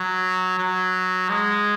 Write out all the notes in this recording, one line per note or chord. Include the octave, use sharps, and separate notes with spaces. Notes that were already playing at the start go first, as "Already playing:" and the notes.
Already playing: F#3
F#3
G#3